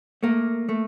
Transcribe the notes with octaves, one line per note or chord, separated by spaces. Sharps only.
A3 A#3
A3